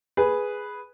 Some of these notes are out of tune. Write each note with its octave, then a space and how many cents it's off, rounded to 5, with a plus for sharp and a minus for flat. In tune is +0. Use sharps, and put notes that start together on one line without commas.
G#4 +0 B4 +0